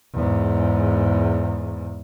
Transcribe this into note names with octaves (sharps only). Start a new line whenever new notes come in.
E2 G#2